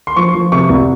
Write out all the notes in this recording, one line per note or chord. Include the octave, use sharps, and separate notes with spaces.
C6
F3 C#6
F3
C3 C#6
C2